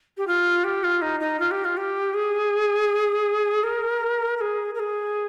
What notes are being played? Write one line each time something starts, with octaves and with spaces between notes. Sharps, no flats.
G4
F4
G4
F4
D#4
D#4
F4
G4
F4
G4
G#4
A#4
A#4
G#4
A#4
G#4